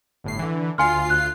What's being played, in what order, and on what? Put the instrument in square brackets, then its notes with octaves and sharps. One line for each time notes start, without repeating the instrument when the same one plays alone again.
[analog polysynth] G1 A2 C7
D3 E3
[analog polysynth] D2 F4 C7 [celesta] G#5 C6 F6
[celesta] F#6